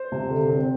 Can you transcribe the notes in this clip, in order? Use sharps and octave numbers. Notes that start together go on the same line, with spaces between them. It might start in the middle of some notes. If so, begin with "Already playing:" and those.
Already playing: C5
C3
D3
C4